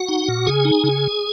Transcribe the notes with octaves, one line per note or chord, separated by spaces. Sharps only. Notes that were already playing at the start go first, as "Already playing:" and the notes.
Already playing: F#4 F#5
D#4
A#2
C#3 G#4 G#5
D#4
C#3